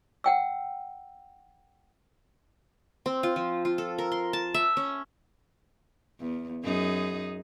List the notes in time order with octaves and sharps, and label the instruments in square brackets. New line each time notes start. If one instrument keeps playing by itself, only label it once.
[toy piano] F#5 G5 E6
[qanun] C4
F4
F3
F4
A4
A#4
C6
A5
E5
C#4
[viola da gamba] E2
F#2 D#4 G#4